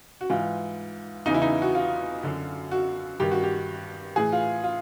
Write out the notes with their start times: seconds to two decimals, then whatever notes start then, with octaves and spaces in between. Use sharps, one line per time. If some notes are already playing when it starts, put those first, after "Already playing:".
0.21 F#4
0.30 G#2 E3 F4
1.26 E2 C#3 E3 D#4
1.34 E4
1.42 D#4
1.62 F#4
1.75 F4
2.23 F#2 D3
2.71 F#4
3.20 G2 D#3 G4
3.31 F#4
3.43 G4
4.16 A2 E3 G#4
4.32 F4
4.64 F4